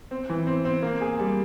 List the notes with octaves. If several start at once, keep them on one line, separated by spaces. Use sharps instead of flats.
C4
E3
C4
C4
A#3
G#4
G3